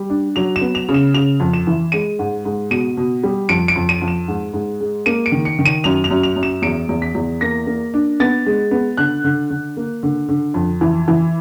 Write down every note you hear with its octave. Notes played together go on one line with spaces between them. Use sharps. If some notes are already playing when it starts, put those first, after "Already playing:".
Already playing: G3
D4
F#3 F7
E7
B3
F7
C#3
E7
C#3 F7
F2
E7
E3
G#3 D#7
G#2
G#2
B2 D#7
B2
G3
F2 D7
D7
F2
D#7
F2
E7
G#2
G#2
G#3
A#3 D#7
D7
D#3
C#7
D#3
D#7
F#2 F7
F7
F#2
F7
F#2
E7
E2 D7
E2
B6
E2
A#3 A#6
A#3
D4
B3 A6
G#3
B3
D3 F#6
D3
D3
A#3
D3
D3
F2
E3
E3